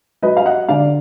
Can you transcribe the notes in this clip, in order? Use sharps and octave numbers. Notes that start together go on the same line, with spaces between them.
F#3 B4 D#5
F5
D#5 F#5
D3 D5 F5